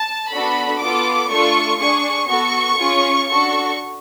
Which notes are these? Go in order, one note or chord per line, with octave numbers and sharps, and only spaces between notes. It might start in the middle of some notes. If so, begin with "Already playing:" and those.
Already playing: A5
B3 D4 F#4 A4 B5
B3 F4 A4 D6
A3 D4 F4 A4 C#6
D4 G#4 C#6
B3 F#4 A4 C#6
C#4 F4 G#4
D4 F#4 A4 C#6